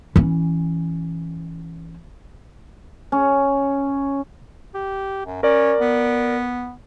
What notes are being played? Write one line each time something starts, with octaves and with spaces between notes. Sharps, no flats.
E3 C#4
C#4
G4
F#2
C#4 A#4 D5
B3